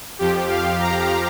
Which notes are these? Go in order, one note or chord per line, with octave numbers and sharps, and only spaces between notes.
F2 F3 G4
F5
A#5